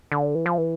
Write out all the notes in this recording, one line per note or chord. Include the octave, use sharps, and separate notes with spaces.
D3
E3
F3
E3